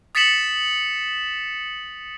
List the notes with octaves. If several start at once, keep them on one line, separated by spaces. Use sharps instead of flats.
D#6 A6 B6 C#7 E7 F#7